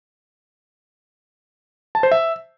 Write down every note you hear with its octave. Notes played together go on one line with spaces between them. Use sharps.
A5
C5
E5